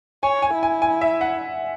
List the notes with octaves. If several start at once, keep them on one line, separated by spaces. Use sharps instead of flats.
C#5 G#5
G#5
E4
G#5
G#5
E5
F#5